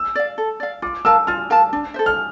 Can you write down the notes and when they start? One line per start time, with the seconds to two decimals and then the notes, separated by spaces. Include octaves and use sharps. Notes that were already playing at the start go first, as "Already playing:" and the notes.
Already playing: E6
0.15 D5 F5
0.38 A4
0.60 D5 F5
0.82 F4 D6
1.05 A#4 F5 A5 E6
1.27 F4 F6
1.50 A#4 F5 A5
1.73 D4
1.94 A4 C5 E5
2.06 F6